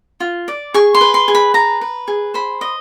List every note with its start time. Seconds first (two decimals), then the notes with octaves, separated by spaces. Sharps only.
0.20 F4
0.48 D5
0.74 G#4 C#6
0.94 C6
1.01 B4
1.14 C6
1.28 G#4
1.35 B5
1.54 B4 A#5
1.81 B4
2.08 G#4
2.34 C5 B5
2.61 D#5